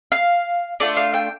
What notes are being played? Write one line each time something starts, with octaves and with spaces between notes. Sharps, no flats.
F5
A3 D4 F4 D5
F5
G5